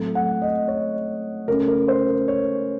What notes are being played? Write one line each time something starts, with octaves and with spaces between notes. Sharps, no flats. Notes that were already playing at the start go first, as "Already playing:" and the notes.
Already playing: A2 F#3 A3 C4
F#5
D#5
C#5
C#3 A3 C#4 A#4
A#4
C5
A#4
C#5